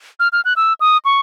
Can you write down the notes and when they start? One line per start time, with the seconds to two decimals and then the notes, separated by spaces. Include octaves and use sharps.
0.20 F6
0.33 F6
0.45 F#6
0.56 E6
0.80 D#6
1.05 C#6